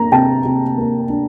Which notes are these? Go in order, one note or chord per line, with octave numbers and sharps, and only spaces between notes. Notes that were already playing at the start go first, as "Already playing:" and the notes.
Already playing: A#3 D4 A#5
C3 G5 A5
C3
A#3
D4